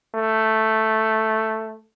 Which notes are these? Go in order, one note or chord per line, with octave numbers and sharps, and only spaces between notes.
A3